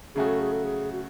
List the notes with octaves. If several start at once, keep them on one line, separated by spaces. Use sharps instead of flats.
C#3 F#3 A3 C#4 F#4 G#4
A4
G#4
A4
G#4
F#4